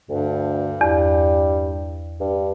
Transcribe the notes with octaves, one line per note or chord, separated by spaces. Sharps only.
D2 G2
E2 G3
G2